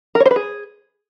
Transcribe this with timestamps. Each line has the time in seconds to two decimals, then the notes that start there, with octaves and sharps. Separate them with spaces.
0.15 A#4
0.20 C#5
0.26 C5
0.31 B4
0.36 G#4